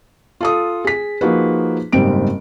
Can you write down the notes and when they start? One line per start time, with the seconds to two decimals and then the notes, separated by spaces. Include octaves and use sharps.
0.41 F4 A4 D#6
0.85 G#4 B6
1.21 F3 A#3 D#4 F#4 G#4 B4
1.92 F#1 G#2 G3 C4 D7